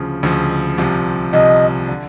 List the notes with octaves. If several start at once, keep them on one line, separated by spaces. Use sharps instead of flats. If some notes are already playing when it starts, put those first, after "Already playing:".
Already playing: D2 C#3 F3
D2 C#3 F3
C2 C3 F3
C2 C3 F3 D#5
D3